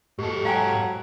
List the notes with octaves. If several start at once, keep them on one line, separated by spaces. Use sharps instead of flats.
G#2 G4 A4
F#3 F5 G5 G#5